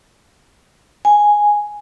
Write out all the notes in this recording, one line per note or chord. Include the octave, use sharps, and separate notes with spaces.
G#5